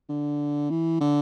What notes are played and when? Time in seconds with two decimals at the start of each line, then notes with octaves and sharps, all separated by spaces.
0.09 D3
0.70 E3
1.01 D3